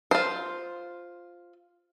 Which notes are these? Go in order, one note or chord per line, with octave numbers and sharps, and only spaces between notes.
F4 C5